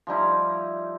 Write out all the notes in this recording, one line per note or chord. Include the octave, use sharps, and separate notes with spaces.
F3 G3 D#4 E4